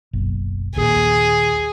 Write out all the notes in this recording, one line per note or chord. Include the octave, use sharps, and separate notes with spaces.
F#1 B1
A#1 D#2 A#2 G#4